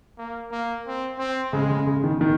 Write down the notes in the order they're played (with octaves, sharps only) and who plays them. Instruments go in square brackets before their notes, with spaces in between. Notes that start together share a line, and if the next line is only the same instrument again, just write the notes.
[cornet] A#3
A#3
C4
C4
[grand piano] C#3 [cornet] G#3
[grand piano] C#3
C#3
D#3
D#3